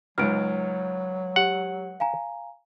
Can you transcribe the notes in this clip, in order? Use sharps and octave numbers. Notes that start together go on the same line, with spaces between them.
C#2 G#2 F#3 F6 D7
G4 F#5
F5 G#5 A#5